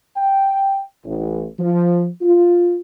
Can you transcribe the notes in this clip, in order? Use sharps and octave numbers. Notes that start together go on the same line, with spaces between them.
G5
A1
F3
F4